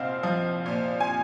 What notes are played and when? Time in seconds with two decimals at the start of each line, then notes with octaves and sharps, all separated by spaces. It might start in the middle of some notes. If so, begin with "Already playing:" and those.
Already playing: C2 A#2 C4 D#5 F5
0.23 F3
0.66 A#2
1.00 G#5